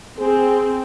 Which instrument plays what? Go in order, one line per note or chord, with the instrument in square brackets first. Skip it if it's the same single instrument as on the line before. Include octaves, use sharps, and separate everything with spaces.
[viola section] C4 [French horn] G#4